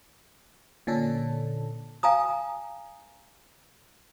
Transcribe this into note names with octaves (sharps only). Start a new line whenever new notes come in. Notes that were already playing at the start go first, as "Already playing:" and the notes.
A#2 D3 C#4 D4 A4
F5 G#5 A#5 D#6